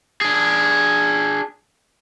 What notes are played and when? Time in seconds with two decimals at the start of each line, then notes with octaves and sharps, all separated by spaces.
0.21 D4 G#4